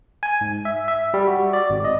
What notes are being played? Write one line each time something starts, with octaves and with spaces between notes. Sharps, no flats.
G#5
G#2
E5
E5
G3
F#4
D5
G#1
D#5